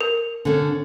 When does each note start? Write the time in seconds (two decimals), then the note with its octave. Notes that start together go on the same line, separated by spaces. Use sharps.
0.01 A#4
0.45 D3 C#4